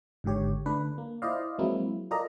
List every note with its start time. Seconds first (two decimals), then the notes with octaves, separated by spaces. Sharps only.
0.24 G#1 G#2 D3 G4 C#5
0.66 D3 A3 D4 B4
0.98 A#3
1.22 E4 F4 C5 D5 D#5 F5
1.58 F3 F#3 G#3 A#3 C4 E4
2.11 F4 A4 A#4 D5 D#5 A#5